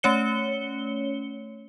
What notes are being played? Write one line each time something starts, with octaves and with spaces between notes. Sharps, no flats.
A3 C#4 C#5 C#7 G7